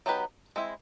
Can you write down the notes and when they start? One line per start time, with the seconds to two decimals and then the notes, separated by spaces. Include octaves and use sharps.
0.06 F#3 B3 D#4 G4 B4
0.56 G#3 C4 E4